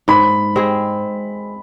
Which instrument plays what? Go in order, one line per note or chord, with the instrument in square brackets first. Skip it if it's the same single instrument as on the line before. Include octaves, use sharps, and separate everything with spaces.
[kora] G#2 [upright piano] B5
[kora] G#3 C4 G#4